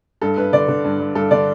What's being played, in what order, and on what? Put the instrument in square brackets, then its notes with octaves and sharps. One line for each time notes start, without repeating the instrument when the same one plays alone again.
[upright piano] G2 A4
G2 B4
D3 D5
D3
G2
G2
G2 A4
D3 D5